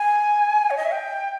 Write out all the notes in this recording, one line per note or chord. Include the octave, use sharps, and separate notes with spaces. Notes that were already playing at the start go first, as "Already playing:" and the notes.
Already playing: G#5
C#5
D#5
E5
G5